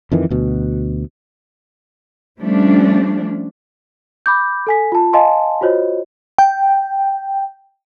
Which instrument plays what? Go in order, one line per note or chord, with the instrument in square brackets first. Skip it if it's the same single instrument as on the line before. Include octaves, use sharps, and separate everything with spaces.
[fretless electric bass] F2 D#3 E3
D2 B2
[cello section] F3 G3 A3 C#4 D4
[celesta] B5 D6 G6
A4 G#5 B6
F4 A5
D#5 F5 G#5 A5 C6
F4 F#4 C5 C#5 D#5
[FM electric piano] G5